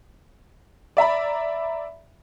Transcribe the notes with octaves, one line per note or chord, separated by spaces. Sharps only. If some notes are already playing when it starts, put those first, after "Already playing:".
D5 E5 A#5 B5